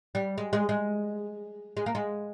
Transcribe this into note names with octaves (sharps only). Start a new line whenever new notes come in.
G3
G#3
G#3
G#3
G#3
A#3
G#3